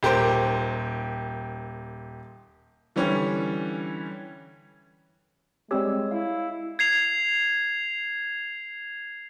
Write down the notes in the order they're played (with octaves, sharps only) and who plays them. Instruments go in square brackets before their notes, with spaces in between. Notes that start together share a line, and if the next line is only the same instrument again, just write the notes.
[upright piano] D#1 G4 A#4 C5
[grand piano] D3 E3 G3 C#4
[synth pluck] G3 C4 G4 [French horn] G#3 [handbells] C#5 E6
[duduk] E4 [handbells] F5
[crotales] G#6 C7 F7